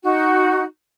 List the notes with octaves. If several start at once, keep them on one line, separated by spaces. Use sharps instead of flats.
D#4 F#4